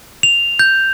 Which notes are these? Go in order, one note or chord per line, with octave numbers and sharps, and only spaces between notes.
F7
G6